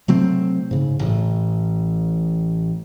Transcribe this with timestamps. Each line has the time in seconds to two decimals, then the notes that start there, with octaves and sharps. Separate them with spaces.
0.08 C3 F#3 A3 C4
0.71 G#2 C#3
0.99 A1 A2